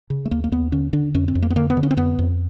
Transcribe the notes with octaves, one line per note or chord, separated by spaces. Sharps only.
C#3
A3
D#2 A#3
A#3
D#2 B3
D3 C#4
D3 D4
F2 C#4
C4
F2
A#3
B3
D3 A#3
B3
D3
C#4
C4
F2 B3
F2